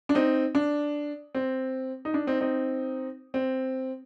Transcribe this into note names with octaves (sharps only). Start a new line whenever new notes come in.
D4
C4 D#4
D4
C4
D#4
D4
C4 D#4
C4 D#4
C4